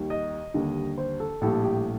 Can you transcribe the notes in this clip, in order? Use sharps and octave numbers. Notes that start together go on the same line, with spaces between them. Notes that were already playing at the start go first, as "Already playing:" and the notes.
Already playing: D#2 D#3 G3
D#5
D#2 D3 G3
C5
A4
A#1 A2 G3 A4
G4